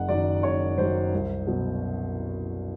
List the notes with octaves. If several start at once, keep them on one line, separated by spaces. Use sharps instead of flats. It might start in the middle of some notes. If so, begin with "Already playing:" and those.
Already playing: F#1 F#5
F#2 D#3 F#3 D5
F#1 C#5
F#2 D#3 F#3 C5
C2
B2 F#3